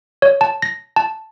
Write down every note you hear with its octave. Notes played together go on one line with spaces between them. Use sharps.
C#5
A5
A#6
A5